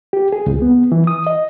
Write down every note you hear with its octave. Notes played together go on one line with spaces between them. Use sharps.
G4
G#4
C#2
B3
E3
D#6
D#5